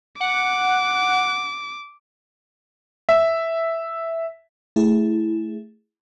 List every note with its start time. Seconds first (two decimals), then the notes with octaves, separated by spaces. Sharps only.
0.20 F#5 D6
3.09 E5
4.76 A3 E4 G#4